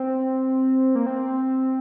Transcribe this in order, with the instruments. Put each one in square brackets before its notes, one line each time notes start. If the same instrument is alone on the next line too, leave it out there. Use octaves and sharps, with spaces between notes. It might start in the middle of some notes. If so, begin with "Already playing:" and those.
Already playing: [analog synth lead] C4
A#3
C4